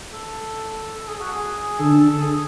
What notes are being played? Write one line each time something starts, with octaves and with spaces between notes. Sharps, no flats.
A4
A4
G#4
F#4
G#4
D3 A4
A4
G#4